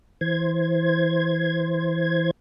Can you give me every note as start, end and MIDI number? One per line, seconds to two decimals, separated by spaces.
0.21 2.31 52
0.21 2.31 72
0.21 2.31 92